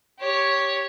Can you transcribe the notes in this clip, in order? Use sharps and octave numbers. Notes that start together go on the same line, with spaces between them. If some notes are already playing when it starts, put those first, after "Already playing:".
G4 C#5